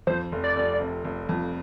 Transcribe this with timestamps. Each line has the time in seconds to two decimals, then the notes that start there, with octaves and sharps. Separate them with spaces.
0.07 F2 C5
0.32 F1
0.44 D5
0.56 F1
0.80 C3
1.04 F1
1.29 F2